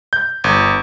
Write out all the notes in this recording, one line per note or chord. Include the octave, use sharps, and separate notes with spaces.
G6
G1